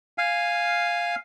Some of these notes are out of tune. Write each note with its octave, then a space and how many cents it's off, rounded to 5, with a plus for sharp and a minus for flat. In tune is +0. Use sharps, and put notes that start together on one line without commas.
F5 +0 G#5 -5